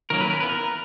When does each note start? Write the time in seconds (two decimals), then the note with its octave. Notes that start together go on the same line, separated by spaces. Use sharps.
0.10 D#3 F#3 A#3 C#4 A#4
0.21 B4
0.30 A#4
0.40 E3 B3 B4
0.49 A#4